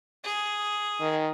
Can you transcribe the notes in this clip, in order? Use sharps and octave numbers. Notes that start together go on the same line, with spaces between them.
G#4
D#3